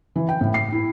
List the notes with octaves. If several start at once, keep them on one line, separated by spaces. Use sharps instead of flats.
E3
G5
A2
C7
E4